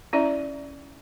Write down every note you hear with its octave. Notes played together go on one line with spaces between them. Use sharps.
C#4 E4 D5 E5